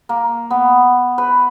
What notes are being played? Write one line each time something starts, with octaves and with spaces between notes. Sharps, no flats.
A#3
B3
B4